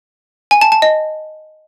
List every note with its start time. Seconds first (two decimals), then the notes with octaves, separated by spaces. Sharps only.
0.51 G#5
0.61 A5
0.72 A5
0.82 D#5